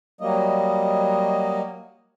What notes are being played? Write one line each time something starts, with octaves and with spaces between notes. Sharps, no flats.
F#3 G3 A#3 D#5